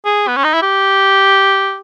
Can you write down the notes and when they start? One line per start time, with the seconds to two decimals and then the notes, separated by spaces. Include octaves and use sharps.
0.05 G#4
0.27 B3
0.36 C#4
0.44 D#4
0.53 E4
0.62 G4